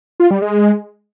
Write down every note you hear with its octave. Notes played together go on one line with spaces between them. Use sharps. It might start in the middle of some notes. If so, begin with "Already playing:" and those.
F4
G3
G#3